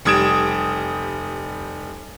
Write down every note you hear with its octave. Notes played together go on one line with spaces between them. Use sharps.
F1 G3 D#6 G#6 D7 E7